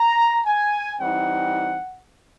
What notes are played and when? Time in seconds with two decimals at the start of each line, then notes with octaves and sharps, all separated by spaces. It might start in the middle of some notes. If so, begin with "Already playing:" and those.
Already playing: A#5
0.46 G#5
1.01 E3 G3 C4 D#4 F#5